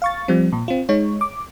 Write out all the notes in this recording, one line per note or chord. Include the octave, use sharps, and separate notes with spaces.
F5 C#6 A6
F3 G3 C4
A#2
C4 F4
G#3 D#4 C#5
D6